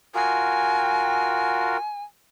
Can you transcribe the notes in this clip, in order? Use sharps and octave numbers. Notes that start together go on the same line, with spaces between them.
F4 F#4 A#4 G#5